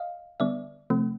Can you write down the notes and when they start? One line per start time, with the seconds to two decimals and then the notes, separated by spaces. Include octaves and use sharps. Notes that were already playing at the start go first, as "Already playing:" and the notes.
Already playing: D#5 F5
0.40 D3 G3 B3 D5 E5
0.90 C3 F3 A3 C4